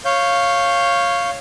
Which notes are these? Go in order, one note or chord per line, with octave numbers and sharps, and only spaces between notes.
C#5 F5 G6